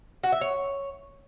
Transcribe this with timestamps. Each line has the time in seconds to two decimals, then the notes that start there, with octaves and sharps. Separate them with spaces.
0.24 F#4
0.32 E5
0.41 C#5